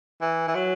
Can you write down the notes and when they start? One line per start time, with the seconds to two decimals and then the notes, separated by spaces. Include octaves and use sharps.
0.21 E3
0.48 E3
0.55 F#3